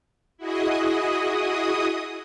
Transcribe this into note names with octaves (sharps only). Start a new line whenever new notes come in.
E4 F#4 G#4 D#5 D#6